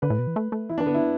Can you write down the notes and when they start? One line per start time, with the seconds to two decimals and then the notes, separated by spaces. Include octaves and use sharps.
0.02 D3 B4
0.10 A2
0.19 B2
0.27 E3
0.36 A3
0.52 A3
0.69 E3 E4
0.78 D4
0.80 E3
0.86 D3 B3
0.94 E4